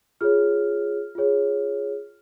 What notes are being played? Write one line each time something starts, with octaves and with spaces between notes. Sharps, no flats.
F4 G#4 C#5 F6
F4 G#4 C#5